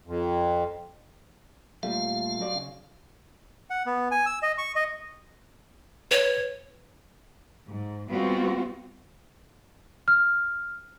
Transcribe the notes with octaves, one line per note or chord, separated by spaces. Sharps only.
F2
A#2 G3 A3 F5
F#2 F#4 D5
C#3
F#5
B3
G#5
E6
D#5
C#6
D#5
B4 C#5
G#2
G3 G#3 B3 C4 F4 F#4
F6